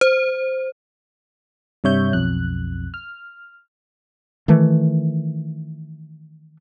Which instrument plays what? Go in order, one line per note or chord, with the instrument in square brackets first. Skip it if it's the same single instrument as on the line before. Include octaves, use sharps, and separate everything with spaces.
[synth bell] C5
[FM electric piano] G2 C3 G3 C#5 E5 G6
B1 F2 F#6
F6
[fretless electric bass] D#3 E3 A3